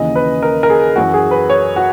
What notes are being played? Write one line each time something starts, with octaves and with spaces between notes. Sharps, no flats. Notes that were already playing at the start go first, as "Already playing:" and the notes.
Already playing: D#2 C#3 E3 D#5
B4
A#4
A#4
G#4
F#2 E3 F#4
G#4
B4
C#5
F#4